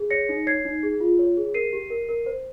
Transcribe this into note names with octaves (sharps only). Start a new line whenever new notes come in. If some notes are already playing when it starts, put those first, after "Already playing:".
Already playing: G#4
C#5 A#6 C#7
D#4
C#5 G#6 C7
D#4
G#4
F4
C#5
G#4
A#4 C7 D#7
G4
A#4
A#4
C5